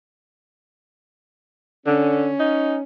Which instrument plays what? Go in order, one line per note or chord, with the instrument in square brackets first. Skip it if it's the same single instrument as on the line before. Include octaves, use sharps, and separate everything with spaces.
[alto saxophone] D3 [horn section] C#4
[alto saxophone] D#4